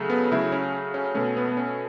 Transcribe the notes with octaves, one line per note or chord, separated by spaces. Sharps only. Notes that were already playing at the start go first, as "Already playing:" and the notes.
Already playing: C#3 F#3 A3
B3
C#3 F#3 A3 E4
C#4
C#4
B2 A3 C#4
B3
B3
C#4